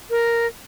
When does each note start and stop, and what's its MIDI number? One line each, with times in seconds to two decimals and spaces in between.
0.10 0.46 70